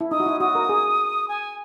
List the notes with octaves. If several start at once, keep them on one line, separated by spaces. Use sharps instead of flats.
E4
D#4 D#6
F#4
E4
F#4 D#6
A#4
G#4
G#5